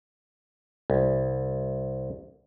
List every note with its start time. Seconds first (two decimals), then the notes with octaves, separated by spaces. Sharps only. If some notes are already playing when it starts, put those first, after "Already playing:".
0.90 C2